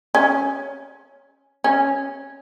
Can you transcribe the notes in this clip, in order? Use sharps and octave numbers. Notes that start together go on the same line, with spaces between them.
C#4
C#4